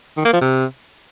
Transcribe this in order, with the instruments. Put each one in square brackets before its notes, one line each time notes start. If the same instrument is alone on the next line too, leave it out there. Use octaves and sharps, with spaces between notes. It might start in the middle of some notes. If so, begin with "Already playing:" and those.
[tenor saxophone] D#3
A#3
F3
C3